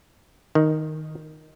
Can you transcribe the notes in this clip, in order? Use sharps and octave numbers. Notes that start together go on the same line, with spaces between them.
D#3